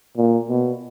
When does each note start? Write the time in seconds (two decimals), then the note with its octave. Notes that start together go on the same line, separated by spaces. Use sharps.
0.17 A#2
0.49 B2